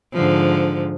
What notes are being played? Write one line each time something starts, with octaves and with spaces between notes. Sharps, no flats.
G#2 D3 F3